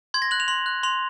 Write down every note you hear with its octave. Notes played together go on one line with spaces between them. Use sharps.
C6 G#6
A#6
F#6 F#7
F7
C6 F#7
F#6
C6 F7